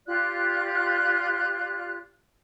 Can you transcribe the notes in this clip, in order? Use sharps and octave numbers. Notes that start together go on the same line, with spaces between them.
F4 G4 D5 F#6